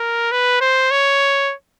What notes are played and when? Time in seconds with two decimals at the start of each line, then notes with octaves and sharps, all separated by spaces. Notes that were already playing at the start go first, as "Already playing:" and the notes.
Already playing: A#4
0.31 B4
0.61 C5
0.91 C#5